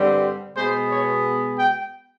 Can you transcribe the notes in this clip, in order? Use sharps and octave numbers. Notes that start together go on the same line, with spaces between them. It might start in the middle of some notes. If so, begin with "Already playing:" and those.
Already playing: G2 D3 G3 C4
B2 G#3 B3 C5
C#5
G5